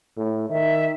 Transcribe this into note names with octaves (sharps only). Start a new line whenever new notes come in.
A2
D#3 E5